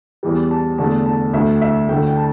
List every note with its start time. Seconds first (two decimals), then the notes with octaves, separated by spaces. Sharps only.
0.23 E2 E3 G3
0.51 A5
0.78 E2 D3 A3 A5
1.06 A5
1.33 D2 D3 A3 E5
1.61 E5
1.89 D2 D3 A3 G5
2.07 G5
2.17 A5